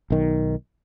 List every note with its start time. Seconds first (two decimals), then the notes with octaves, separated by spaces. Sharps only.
0.10 B1 D#3